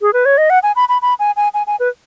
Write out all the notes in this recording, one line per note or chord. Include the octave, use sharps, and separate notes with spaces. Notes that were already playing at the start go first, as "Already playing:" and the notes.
G#4
B4
C#5
D#5
F#5
G#5
B5
B5
B5
G#5
G#5
G#5
G#5
B4